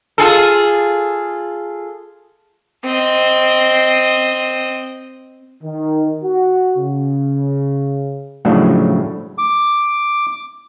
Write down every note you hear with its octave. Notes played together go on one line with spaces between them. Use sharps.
F4 G#4 A4
C4 D#5
D#3
F#4
C#3
A2 C#3 F3 F#3 A3 D4
D6